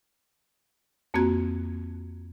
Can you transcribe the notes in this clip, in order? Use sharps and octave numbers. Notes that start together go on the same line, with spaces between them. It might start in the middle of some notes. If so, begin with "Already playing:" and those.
F2 A#3 C4 F#4 G#6